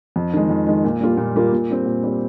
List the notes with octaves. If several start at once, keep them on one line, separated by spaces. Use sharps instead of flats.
F2
D#3 G#3
F2
D#3 G#3
A#2
G3 A#3 F4
A#2
G3 A#3 F4
A#2
G3 C4
A#2
G3 C4